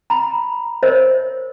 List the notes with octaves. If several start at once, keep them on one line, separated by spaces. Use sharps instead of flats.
A#5 B5
A#4 C5 C#5 D#5 E5